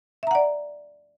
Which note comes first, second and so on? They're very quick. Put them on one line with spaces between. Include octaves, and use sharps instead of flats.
E5 A#5 F#5 D5